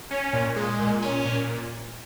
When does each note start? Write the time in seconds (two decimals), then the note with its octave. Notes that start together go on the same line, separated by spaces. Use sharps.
0.11 C#4
0.33 A#2
0.56 G#3
0.79 A#2
1.02 C#4
1.25 A#2